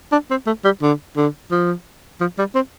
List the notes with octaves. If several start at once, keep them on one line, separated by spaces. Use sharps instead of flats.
D4
C4
A3
G3
D3
D3
F3
F3
G3
C4